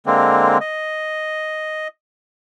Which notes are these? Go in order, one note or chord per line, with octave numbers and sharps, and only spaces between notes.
D3 G#3 A#3 C4
D#5